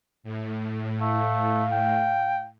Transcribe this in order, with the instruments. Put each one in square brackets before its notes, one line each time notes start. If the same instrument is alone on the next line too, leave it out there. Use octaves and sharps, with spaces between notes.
[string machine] A2
[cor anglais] A3 [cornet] F5
[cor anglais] G5